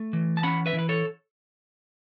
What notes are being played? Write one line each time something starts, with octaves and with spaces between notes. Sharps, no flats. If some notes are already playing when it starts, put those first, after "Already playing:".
Already playing: A3
E3
A5
C#4 F#5 B5
B4 E5
E3
B4
A4 C#5